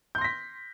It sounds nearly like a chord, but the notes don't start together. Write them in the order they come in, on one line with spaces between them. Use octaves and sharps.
G6 C6 A#6 B6